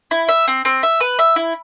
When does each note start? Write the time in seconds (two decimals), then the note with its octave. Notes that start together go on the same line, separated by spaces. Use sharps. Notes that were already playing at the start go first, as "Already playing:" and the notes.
0.11 E4
0.29 E5
0.48 C4
0.65 C4
0.83 E5
1.00 B4
1.19 E5
1.36 E4